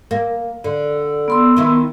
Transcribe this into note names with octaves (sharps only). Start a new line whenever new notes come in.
A#3
D3
B3 C6 E6
D#3 E3 E4